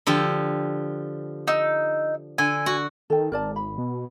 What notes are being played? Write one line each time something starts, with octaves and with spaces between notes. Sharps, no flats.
D3 F3 G4
D#4 E6
D3 G#5
F#4
D#3 A4 G5
G#1 A#4 D5 A5
B5
B2